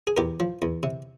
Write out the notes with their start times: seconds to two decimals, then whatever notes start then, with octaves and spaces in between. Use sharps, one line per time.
0.07 G#4
0.17 E2 G4 A#4
0.40 F3
0.62 E2
0.83 C3